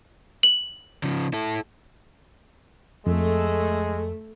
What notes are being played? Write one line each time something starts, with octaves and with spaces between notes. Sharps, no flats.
F#7
C#3 F3
E4 A4
F2 G#3 A3